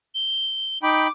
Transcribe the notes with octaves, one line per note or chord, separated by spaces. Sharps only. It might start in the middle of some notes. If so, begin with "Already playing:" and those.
G7
D#4 G5 B5 D6